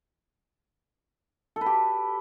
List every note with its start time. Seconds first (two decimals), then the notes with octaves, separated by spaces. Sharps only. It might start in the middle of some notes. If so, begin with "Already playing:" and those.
1.56 A4
1.61 B4
1.66 G4